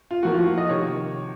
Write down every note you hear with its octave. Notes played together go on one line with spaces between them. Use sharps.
F4
A2 F3 A#3 F#4
F4
F4
D#5
C3 D#3 C#5